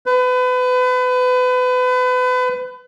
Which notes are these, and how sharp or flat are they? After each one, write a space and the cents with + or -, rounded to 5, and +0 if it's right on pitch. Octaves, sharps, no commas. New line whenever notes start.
B4 +30